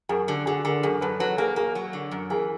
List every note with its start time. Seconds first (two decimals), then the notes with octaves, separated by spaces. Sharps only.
0.09 F#2 G#4 A#4
0.28 D3 G4 A4
0.46 D3 F#4 G#4
0.64 D3 G#4 A#4
0.83 F#2 G#4 A#4
1.01 F#2 A4 B4
1.20 F#3 A4 B4
1.38 A#3 G#4 A#4
1.56 A#3 G#4 A#4
1.75 F#3
1.93 D3
2.11 F#2
2.30 E3 G#4 A#4